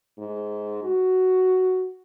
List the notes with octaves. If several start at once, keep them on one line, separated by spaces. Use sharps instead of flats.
G#2
F#4